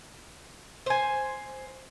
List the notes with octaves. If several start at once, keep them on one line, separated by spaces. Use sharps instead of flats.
C5 G#5